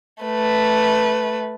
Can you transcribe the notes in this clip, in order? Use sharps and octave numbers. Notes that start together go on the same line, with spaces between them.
A3 B4